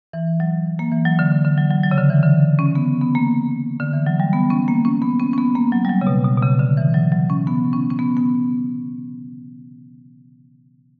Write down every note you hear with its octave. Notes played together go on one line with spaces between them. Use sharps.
E3
F#3
A#3
E3
F#3
D3
D3
D3
F#3
F#3
F#3
C#3
D3
E3
D3
C#4
B3
B3
A#3
D3
E3
F#3
G3
B3
C#4
A#3
C#4
B3
C#4
C#4
B3
A#3
F#3
G3
F#3
C#3
B2
B2
B2
C#3
D3
E3
F#3
F#3
C#4
B3
C#4
C#4
B3
B3